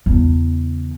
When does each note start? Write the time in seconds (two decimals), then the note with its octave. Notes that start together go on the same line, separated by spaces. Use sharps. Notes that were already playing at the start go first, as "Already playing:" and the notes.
0.06 E2 C#3